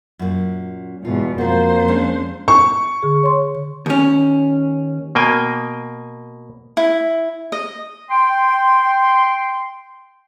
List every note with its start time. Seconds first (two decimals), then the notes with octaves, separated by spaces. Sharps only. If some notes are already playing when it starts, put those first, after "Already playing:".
0.19 F#2 A#2
1.05 E2 G#2 B2 F4
1.38 F2 A#3 F4 F#4 C5
1.88 G#3 C#4 D4
2.48 C#6
3.02 D3 G#4
3.23 C#5 C6
3.86 D#2 C#4
5.15 B2 A#3 G5 G#5
6.77 E4
7.52 D#5
8.11 G5 C6